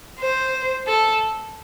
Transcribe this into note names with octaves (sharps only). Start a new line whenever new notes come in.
C5
A4